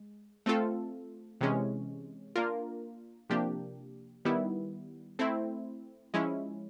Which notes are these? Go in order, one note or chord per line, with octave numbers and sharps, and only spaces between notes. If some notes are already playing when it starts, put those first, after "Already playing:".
Already playing: G#3
A3 C4 F4 A4
C3 E3 G#3 C#4
A#3 D4 F4 A#4
C3 F3 A#3 D4 G4
D#3 G3 B3 E4
A3 C4 E4
F3 G#3 C#4 E4